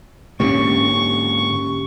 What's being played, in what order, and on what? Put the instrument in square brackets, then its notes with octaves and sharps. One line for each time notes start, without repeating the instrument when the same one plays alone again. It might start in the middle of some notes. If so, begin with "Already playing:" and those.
[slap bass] G#2 D3 A#3 [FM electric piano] C#4 G4 [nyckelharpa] C#6